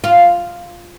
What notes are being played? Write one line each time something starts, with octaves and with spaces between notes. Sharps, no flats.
F4